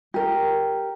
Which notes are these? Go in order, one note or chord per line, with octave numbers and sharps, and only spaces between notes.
G4 A#4